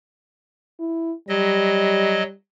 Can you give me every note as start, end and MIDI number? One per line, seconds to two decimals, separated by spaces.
0.80 1.13 64
1.29 2.23 54
1.29 2.34 55
1.29 2.23 75